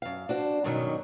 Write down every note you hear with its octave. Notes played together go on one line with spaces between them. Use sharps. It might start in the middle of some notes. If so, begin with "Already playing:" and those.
F#2 F5
D4 F#4 C5
G2 B2 D#3 F#3 C#4 D#4